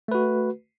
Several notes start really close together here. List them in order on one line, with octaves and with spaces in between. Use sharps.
A3 B4 F#4